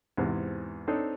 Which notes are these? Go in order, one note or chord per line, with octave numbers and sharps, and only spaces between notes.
E2 G#2 C3
C4 D4 D#4 A4 C5 C#5